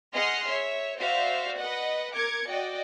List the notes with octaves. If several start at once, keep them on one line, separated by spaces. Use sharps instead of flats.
G#4 D#5 F#5 C6 F6
C#5 E5
F#4 C5 D5 E5 F5
B4 D#5 F#5
A#4 D6 G#6 C#7
F#4 D5 D#5 G5